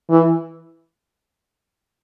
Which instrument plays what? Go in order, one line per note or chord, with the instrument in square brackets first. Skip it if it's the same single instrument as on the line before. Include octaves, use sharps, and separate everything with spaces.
[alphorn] E3